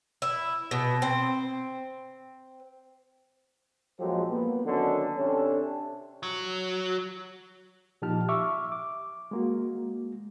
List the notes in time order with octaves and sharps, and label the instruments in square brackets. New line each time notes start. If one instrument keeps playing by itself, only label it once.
[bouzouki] E4
B2
C4
[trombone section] A#1 F3 F#3 G#3 G4 A4
A#3 B3
D3 D#3 F#3 C#4 D#4 A4
C3 C#4 D4 A4
[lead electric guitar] F#3
[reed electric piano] A#2 F3 D#4 G4 A5 F6
E5 C#6 D6 E6 F6
D6
G#3 A#3 F#4